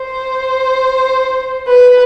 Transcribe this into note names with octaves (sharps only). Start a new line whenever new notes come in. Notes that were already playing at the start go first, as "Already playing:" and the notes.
Already playing: C5
B4